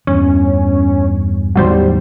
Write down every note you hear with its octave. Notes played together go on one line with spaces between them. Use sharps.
E2 G2 C#4
A1 E2 D#3 F#3 G3 C5